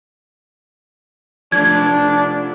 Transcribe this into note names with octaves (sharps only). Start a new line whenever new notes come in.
F3 A3 D4 G#6